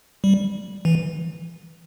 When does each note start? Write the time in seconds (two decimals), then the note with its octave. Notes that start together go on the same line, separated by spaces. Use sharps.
0.24 G3
0.85 E3